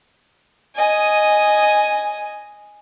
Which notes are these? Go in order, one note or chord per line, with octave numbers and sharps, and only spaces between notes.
D#5 G#5